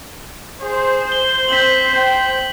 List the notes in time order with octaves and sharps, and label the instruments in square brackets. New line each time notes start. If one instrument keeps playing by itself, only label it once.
[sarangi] G#4 [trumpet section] C5
[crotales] G7
[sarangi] C4 [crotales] B6 F#7
[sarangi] G5